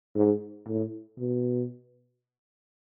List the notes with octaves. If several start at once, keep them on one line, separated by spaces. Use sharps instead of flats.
G#2
A2
B2